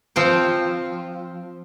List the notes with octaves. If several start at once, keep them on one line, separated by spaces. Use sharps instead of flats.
F3 C4 G5